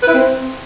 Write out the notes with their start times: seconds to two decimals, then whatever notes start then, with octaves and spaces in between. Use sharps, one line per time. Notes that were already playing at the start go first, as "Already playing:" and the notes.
0.02 B4
0.07 E4
0.13 C4